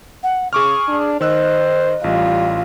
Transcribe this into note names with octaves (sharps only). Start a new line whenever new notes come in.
F#5
C#3 G#4 C#6 D6 F6
D4
D#3 C5 D#5 E6 F#6
A1 G3 F4